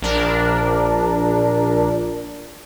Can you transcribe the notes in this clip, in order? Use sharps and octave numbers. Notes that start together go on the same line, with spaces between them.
A#1 D4 A#4